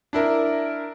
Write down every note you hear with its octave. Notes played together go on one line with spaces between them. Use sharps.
D4 E4 A#4